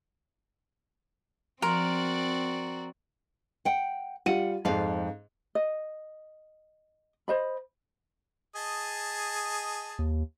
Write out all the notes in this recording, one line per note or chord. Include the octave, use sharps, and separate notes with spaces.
F3 C4 F#4 A#4 D5 C6
F#5 G5
G3 F4 F#5 D#7
F2 G#2 D5 F5
D#5
C5 D#5 B5
G#4 D#5 A5
D#2